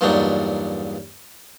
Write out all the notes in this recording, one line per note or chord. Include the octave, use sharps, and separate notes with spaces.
E2 G2 A#2 F#3 D4 D#4